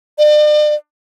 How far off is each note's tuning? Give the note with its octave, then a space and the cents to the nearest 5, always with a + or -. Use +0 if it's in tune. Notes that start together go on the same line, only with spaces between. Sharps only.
D5 +40